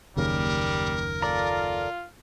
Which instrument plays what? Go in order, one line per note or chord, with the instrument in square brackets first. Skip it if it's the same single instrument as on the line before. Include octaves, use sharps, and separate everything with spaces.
[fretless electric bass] F#1 D#2 C#3 [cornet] G3 [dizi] A#4
[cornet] F4 [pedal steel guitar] A4 D5 A#5